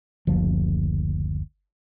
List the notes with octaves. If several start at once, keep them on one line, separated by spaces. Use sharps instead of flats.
F#1 D2 F3